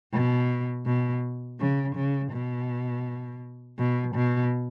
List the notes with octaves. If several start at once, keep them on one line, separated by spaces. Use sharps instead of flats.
B2
B2
C#3
C#3
B2
B2
B2